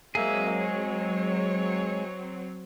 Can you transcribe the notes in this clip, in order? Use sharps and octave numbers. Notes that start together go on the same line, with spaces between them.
F#3 G#3 A#3 C4 G#4 E5
C#5